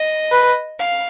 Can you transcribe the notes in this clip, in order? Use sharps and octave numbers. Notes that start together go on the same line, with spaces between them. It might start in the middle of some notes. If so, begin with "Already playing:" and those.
Already playing: D#5
B4
F5